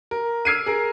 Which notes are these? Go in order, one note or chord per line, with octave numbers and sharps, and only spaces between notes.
A#4
E6 F6 G#6 C7 D7 D#7
G#4 A#4